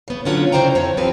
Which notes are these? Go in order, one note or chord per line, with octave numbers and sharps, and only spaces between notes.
C#3 B3
D3 F#3 C#4 F4 C#5
C#3 E4 C5 D5 G5 A#5
F2 B3 C#5
F3 C4 G4 B4